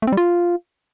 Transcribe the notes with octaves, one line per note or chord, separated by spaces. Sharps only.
A3
C4
G3
F4